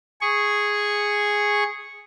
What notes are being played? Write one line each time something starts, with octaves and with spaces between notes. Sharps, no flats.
G#4 C#6